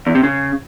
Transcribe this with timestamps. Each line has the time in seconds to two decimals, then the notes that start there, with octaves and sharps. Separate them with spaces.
0.07 E2
0.15 C3
0.23 C#3